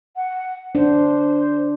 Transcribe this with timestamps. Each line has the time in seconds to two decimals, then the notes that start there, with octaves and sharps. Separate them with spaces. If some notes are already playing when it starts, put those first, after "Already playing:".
0.16 F#5
0.75 D4 C5